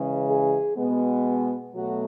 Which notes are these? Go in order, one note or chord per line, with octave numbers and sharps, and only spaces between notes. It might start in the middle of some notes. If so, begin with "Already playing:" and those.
Already playing: C#3 E3 G#3
G#4
B2 G#3 B3
B2 F#3 A3 F#4